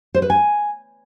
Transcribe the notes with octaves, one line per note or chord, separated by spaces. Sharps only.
C5
B4
G#5